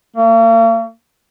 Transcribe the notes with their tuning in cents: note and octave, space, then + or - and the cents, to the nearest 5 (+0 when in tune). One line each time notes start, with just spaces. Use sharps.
A#3 -45